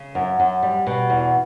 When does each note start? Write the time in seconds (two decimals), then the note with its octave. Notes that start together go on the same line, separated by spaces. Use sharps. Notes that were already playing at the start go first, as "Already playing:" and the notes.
Already playing: C#3
0.15 F#2
0.40 F#2
0.63 G3
0.87 B2
1.10 E2